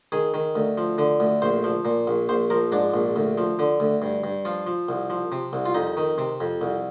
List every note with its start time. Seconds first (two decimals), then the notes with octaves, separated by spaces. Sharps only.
0.12 D#3 G#4
0.34 D#3
0.56 D2
0.78 F3
0.98 D3
1.20 D2
1.42 A#1 C5
1.64 F3
1.85 A#2
2.07 A#1
2.29 A#1 C5
2.50 F3 A#4
2.72 G#2 D4
2.94 A#1
3.16 D2
3.38 F3
3.59 D3
3.80 D2
4.02 G2
4.24 G2
4.45 F3 F4
4.67 F3
4.89 C2
5.10 F3
5.32 C3
5.53 C2
5.66 F4
5.75 F2 D#4
5.97 D#3
6.18 C3
6.41 F2
6.61 C2